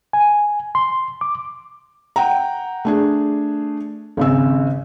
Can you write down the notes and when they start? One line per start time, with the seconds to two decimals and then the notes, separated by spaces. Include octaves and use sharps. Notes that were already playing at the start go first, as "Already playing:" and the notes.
0.13 G#5
0.75 C6
1.21 D6
2.16 F#5 G5 A#5
2.85 A3 D4 G#4
4.17 G#1 C#3 E6